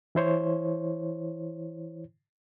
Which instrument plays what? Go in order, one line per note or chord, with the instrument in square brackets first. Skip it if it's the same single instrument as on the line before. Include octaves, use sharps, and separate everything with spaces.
[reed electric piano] E3 E4 C5 C#5